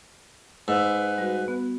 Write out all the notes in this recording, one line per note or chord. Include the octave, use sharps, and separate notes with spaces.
G#2 B4 E6
G3 F#4
B3